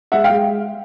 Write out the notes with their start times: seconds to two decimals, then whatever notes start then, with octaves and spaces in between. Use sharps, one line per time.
0.12 G#3 E5 F#5
0.24 F5 G5
0.29 G#3